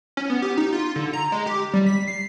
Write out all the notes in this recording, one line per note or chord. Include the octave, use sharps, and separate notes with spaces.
C#4
B3
G4
D#4
F4
D3
A#5
G#3
G4
G3
B6
C7